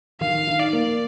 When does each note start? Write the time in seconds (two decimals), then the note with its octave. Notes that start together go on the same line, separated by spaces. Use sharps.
0.21 D#3 F5
0.47 D#4
0.60 D5
0.73 A#3